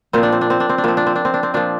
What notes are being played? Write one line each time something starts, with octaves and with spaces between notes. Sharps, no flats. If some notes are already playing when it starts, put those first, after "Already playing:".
A#2 F3 C4
D4
C4
D4
C4
D4
C4
D4
A#2 F3 C4
D4
C4
D4
C4
D4
C4
A#2 F3 D4